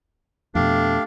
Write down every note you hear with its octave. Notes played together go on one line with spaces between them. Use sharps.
F2 B2 A3 D4 G4 F5